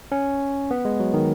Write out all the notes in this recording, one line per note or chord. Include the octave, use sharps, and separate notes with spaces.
C#4
B3
G#3
F#3
D#3